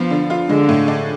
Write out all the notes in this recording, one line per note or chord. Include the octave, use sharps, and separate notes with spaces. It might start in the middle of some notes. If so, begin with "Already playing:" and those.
Already playing: F3 B3 F4
D3
F4
D3 G#3
A2
D4